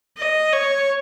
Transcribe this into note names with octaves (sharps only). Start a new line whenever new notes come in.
D#5
C#5